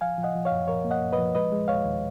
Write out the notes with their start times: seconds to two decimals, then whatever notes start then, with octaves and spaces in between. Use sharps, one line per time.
0.01 F3 F5 G#5
0.18 F3
0.23 D#5 F#5
0.35 F3
0.45 C#5 F5
0.51 F#2
0.68 F3 A#4 C#5
0.85 A#3
0.91 D#5 F#5
1.02 F#2
1.13 B4 D#5
1.18 F3
1.35 G#3 B4 D#5
1.52 G#3
1.68 D#2 C#5 F5
1.85 D#2